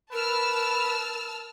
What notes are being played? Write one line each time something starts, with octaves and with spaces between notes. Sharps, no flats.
A#4 B4 A5 E6 F6